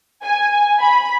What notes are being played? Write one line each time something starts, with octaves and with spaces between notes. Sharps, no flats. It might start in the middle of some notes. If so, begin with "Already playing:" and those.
G#5
B5